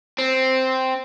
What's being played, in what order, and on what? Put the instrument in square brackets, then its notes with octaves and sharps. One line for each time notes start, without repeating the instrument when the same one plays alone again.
[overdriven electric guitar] C4